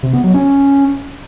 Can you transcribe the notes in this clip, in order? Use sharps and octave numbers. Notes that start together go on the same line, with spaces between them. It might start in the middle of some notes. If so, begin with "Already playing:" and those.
C3
B3
F#3
C#4